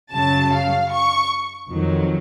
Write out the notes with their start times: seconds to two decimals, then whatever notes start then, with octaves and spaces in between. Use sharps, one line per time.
0.13 F#2 C#3 F#3 A5
0.53 F5
0.91 C#6
1.70 F2 D#3 F#3